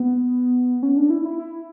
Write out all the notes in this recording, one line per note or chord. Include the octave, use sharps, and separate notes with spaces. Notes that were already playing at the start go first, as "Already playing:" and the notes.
Already playing: B3
C#4
D4
E4
E4
E4